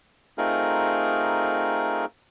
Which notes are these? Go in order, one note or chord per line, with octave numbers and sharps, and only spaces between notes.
A3 C4 D#4 F4 G#4 A#4